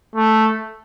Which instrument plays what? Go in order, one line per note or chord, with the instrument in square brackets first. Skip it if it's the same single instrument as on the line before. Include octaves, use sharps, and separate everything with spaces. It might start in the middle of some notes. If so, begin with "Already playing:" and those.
[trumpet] A3